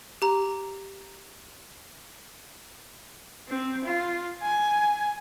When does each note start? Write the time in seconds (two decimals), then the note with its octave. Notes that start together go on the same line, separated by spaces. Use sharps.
0.22 G4 A#5
3.48 C4
3.84 F4
4.43 G#5